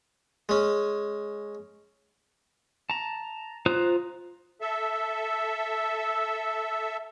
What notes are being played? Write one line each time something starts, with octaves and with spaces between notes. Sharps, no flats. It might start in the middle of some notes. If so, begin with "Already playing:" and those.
G#3 C#4
A5 A#5
F4 C5 A#5 D#6 F#6
A4 E5